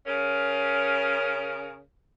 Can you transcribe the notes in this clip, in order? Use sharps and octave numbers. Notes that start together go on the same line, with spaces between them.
C#3 C#4 A#4